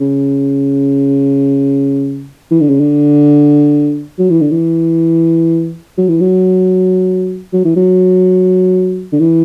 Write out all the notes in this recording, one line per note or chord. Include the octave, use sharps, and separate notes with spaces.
C#3
E3
D3
C#3
D3
F#3
E3
D3
E3
F#3
E3
F#3
F#3
E3
F#3
D3
E3